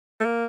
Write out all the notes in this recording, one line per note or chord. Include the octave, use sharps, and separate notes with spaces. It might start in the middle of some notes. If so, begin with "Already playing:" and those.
A3
A#3